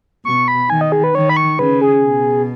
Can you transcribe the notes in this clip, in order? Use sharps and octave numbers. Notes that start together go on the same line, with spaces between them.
B2 C#6
B5
D#3 G#5
D#5
G#4
B4
D#3 C#5
B5
C#6
C#3 B4
G#4
B2